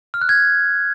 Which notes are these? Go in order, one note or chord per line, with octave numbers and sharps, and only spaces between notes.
F6
F#6
G#6